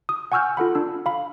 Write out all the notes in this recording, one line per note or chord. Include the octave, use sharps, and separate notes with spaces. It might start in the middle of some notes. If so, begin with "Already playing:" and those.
D#6
F#5 G#5 C#6 E6 F6 G6
F4 A4 F#5 B5
D4 E6
F5 B5